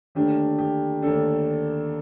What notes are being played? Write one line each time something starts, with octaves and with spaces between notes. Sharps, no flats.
D#2 D3 A3 D4 G4
G4
D#2 D3 A3 D4 A4